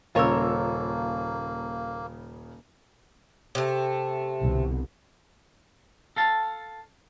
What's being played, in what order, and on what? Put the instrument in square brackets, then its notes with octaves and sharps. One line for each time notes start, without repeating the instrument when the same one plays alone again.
[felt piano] D#1 C#3 E6 [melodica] A#3 [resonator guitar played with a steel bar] F4 A#4 C#5
[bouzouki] C3 A3
[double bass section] C2 B2 D3
[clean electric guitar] A4 F5 A5